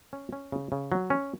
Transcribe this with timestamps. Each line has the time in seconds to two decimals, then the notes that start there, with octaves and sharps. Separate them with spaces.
0.13 C#4
0.33 C#4
0.52 C#3
0.72 C#3
0.92 F#3
1.10 C#4